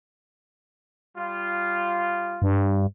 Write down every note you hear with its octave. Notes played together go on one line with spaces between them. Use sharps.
G3 F4
G2